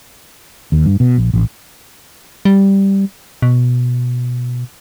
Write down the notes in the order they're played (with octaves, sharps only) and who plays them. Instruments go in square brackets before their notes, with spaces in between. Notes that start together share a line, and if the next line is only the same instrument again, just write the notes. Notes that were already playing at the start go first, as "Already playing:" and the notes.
[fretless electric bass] D#2
G2
B2
A#1
A1
[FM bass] G3
B2